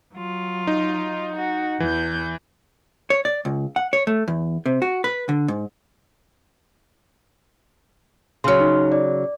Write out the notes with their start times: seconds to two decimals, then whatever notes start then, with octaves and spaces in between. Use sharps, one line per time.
0.14 F#3 F4
0.67 D#4
1.36 F#4
1.80 E2 E3 G6
3.10 C#5
3.25 D5
3.45 C#2
3.76 F#5
3.93 C#5
4.07 A3
4.28 E2
4.66 C3
4.82 F#4
5.04 B4
5.29 D3
5.48 G#2
8.44 C#3 F#3 C6 F6
8.60 D#4
8.92 D5